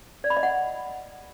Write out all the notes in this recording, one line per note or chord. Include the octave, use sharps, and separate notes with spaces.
D5
B5
D#5
F#5